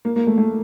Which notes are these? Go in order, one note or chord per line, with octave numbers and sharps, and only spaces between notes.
A#3
A#3
A3
A3